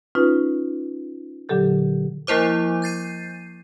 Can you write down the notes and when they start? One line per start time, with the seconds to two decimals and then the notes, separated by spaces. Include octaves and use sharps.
0.15 C#4 D#4 F4 B4
1.49 A#2 D3 F#3 G4 A4 G6
2.27 F3 A#3 E4 C5 D6
2.82 G6 A6 C7 D#7